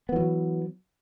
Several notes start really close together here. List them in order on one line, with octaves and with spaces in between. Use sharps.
B3 E3 F#3